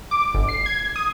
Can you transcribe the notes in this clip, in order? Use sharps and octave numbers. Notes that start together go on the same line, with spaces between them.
D6
G1
C7
G#6
D#6